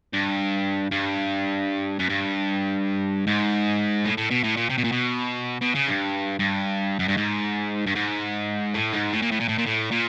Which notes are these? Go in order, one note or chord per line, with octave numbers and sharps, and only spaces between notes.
G2
G2
F#2
G2
G#2
A2
A2
B2
A2
A#2
C3
B2
A#2
B2
B2
C#3
G2
G2
F#2
G2
G#2
G2
G#2
A2
G#2
A2
A#2
A2
A#2
A2
A#2
A2
A#2